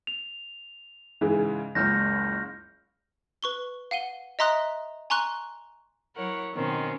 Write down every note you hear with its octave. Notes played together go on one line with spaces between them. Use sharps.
F7
G#2 C#3 E3
F#1 C#2 F6 G6 A#6
B4 C#6 G7
F5 F#5 D#7 G7
D#5 E5 A#5 C6 D#6 F#6
G#5 A#5 C6 C#6 F#6
F#3 E4 A#4 C#5 F#5
B2 D#3 C4 C#4